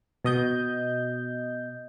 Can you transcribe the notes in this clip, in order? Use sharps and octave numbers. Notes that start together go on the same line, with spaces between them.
B2 D#5 G6